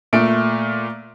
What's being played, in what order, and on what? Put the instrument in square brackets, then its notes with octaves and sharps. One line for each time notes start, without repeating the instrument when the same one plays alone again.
[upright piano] A#2 A3 D7